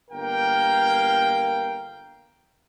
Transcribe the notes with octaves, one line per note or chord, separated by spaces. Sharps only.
G1 A#3 A#4 F5 G5